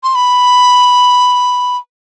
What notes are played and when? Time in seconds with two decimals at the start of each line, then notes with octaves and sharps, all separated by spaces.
0.03 C6
0.15 B5